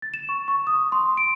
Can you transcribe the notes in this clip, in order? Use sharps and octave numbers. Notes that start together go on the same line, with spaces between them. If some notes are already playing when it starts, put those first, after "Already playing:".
A6
E7
C#6
C#6
D#6
C6
D7